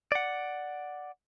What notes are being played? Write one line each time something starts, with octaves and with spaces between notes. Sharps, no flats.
D5 F#5